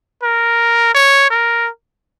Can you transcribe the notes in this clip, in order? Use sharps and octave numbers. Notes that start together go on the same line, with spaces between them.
A#4
C#5
A#4